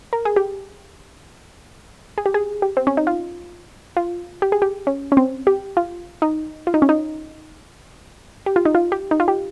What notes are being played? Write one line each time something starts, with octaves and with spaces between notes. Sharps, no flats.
A#4
G#4
G4
G#4
G4
G#4
G4
C4
C#4
D#4
F4
F4
G4
G#4
G4
C#4
C#4
C4
G4
F4
D#4
F4
D#4
C#4
D#4
G4
F4
D#4
F4
G4
D#4
F4
G4